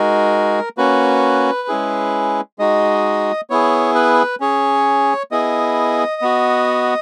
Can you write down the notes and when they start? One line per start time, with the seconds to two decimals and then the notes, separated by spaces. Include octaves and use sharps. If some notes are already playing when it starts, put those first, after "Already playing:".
Already playing: G#3 D#4 F#4 A#4
0.78 A#3 C#4 F#4 B4
1.68 G#3 C#4 E4 G#4
2.59 G#3 D#4 F#4 D#5
3.50 B3 E4 G#4 C#5
3.95 B4
4.40 C#4 G#4 C#5
5.31 B3 E4 G#4 D#5
6.22 B3 F#4